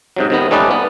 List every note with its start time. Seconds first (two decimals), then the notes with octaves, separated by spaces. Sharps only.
0.16 G#2 C3 F#3
0.30 C3 D#3 B3
0.51 G3 A3 C#4 D#4 B4 D5
0.71 B3